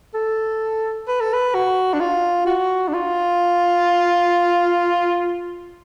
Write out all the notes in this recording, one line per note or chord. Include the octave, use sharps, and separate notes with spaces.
A4
B4
A4
B4
F#4
D4
F4
F#4
D4
F4